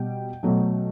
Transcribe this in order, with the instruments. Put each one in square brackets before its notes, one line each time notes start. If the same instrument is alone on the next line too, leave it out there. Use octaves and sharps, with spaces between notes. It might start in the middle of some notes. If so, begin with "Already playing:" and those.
Already playing: [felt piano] B2 G3 G5
B2 F#3 A3